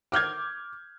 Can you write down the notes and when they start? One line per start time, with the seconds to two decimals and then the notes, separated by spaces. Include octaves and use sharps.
0.12 D6 F6 G6 G#6